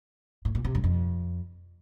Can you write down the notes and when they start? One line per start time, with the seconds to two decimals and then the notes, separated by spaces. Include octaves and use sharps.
0.45 A2
0.55 A#2
0.65 C3
0.75 F#2
0.84 F2